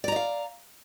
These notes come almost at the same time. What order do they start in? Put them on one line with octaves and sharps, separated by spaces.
D5 A#5 D#5 F5